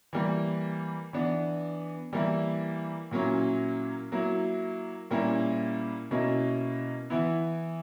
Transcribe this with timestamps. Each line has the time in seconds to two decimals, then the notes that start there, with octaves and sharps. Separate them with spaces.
0.13 E3 G3 A#3
1.13 E3 B3 D4
2.13 E3 G3 A#3 E4
3.11 A#2 F#3 A#3 C#4 E4
4.12 F#3 A#3 E4
5.11 A#2 G3 A#3 C#4 E4
6.11 B2 A#3 C#4 E4
7.10 E3 B3 E4